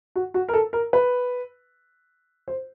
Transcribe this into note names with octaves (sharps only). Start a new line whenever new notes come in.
F#4
F#4
A#4
A4
A#4
B4
C5